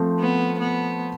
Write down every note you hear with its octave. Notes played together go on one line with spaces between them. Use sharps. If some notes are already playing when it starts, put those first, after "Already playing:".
Already playing: F3 A3 C4
B3
B3